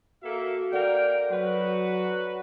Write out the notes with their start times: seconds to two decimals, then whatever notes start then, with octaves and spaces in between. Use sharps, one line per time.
0.23 A#3 F#4 A4 E5
0.72 A#3 A4 A#4 D5 F#5 G5
1.31 F#3 F#4 B4